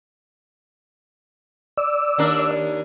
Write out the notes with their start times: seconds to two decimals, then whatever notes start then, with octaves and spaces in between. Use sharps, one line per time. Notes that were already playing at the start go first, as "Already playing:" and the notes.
1.77 D5 E6
2.18 D#2 D4 A#4